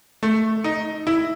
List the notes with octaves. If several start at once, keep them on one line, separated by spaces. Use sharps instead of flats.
A3
D#4
E4